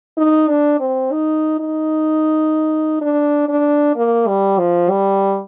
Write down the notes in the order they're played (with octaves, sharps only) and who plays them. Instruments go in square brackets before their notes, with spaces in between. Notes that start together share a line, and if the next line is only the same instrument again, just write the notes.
[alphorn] D#4
D4
C4
D#4
D#4
D4
D4
A#3
G3
F3
G3